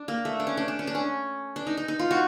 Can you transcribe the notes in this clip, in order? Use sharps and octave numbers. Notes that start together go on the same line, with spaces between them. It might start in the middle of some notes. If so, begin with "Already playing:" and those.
Already playing: D4
A#3
A3
D4
C#4
D4
D4
C#4
D4
C#4
D4
D#4
D#4
D#4
F4
F#4